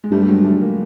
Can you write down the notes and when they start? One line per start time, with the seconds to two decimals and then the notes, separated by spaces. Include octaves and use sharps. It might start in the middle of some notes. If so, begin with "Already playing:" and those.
0.04 G#3
0.11 G2 G3 A3
0.22 G3
0.28 F#3 G#3
0.44 G3 A3
0.61 G#3 A#3